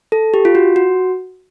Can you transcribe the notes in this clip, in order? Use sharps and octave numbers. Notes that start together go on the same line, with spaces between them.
A4
G4
F4
F#4
F#4